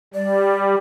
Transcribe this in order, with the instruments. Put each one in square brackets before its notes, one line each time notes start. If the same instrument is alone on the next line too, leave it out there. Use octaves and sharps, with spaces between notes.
[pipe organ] G3 [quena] D5